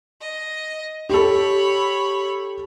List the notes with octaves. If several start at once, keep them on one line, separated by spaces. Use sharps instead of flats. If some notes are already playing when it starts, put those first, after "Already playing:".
D#5
G4 A4 C#5 B5